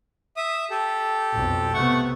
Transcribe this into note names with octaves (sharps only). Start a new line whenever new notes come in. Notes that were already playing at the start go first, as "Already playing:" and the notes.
E5 D#6
G4 A4
B1 F2
C3 A3 B3 F#5 C#6